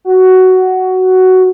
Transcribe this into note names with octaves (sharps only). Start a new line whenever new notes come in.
F#4